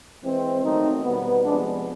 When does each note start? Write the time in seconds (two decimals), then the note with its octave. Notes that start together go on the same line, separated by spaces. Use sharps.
0.24 E3 G#3 C4
0.64 D#3 F#3 A3 C4 D#4
1.04 B2 G3 B3
1.45 C3 F3 G#3 B3 D4